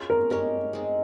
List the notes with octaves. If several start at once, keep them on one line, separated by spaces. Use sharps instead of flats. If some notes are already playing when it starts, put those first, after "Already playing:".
Already playing: C#4 F4 G#4 C#5
A#4
G#3 C#4 G4 A#4 C#5
G#3 C4 D#4 G#4